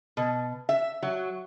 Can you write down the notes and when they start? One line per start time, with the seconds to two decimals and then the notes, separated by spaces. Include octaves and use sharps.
0.17 B2
0.69 E5
1.02 F#3